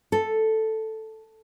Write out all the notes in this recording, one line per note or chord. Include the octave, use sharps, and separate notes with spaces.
A4